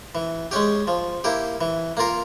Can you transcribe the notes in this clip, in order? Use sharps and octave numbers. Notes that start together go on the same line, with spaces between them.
E3
G#3 C#4 G4
F3
A#3 E4 G4
E3
A#3 F4 A#4